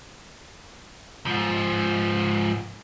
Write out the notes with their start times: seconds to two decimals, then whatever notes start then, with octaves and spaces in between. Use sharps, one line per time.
1.26 G#2 F3